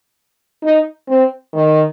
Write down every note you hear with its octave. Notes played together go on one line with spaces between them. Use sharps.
D#4
C4
D#3